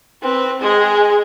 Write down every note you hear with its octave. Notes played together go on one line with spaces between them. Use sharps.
C4 B4
G#3 G#4